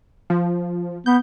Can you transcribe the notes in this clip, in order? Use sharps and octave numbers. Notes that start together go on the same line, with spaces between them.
F3
B3 G6